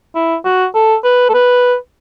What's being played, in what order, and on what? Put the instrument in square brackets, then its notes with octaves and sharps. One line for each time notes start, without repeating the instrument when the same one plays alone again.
[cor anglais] E4
F#4
A4
B4
A4
B4